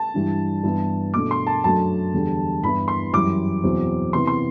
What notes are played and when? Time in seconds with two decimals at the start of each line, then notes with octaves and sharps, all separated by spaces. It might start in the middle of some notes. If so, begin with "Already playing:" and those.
Already playing: A5
0.14 G2 E3 G3 D4
0.63 G2 E3 B3 E4
1.14 B2 A3 D4 D6
1.31 C6
1.47 A5
1.64 F#2 F#3 A3 D4 A5
2.14 E2 D3 G3 D4
2.63 G2 E3 B3 E4 B5
2.88 C6
3.13 F#2 E3 G3 D6
3.64 E2 B2 F#3 C4 E4
4.13 C3 E3 B3 E4 C6
4.27 C6